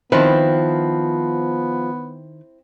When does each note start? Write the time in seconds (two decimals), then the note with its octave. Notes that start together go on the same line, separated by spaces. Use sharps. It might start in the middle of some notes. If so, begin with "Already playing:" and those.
0.12 D#3 F3 B3 C4 E4 B4